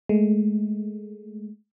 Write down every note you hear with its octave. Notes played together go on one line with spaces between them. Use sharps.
G#3 A3